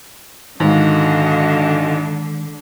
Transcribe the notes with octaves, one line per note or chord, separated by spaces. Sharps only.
G#2 D3 D#3 G#3 F#4 D#5 F5